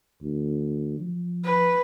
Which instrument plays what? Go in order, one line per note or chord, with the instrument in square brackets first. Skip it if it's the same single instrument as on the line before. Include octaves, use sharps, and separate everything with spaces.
[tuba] D2
F3
[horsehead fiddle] B4